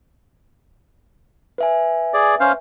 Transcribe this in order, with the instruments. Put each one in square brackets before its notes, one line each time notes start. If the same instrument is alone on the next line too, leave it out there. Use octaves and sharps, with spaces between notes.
[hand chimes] B4 E5 G#5
[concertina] G#4 D5
C#4 C5 F5